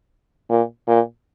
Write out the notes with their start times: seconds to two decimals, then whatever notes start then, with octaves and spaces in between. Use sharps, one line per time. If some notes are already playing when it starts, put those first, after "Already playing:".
0.50 A#2
0.88 A#2